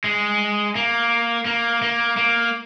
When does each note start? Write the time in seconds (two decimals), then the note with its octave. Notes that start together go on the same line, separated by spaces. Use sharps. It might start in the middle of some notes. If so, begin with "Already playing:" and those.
0.04 G#3
0.75 A#3
1.46 A#3
1.82 A#3
2.17 A#3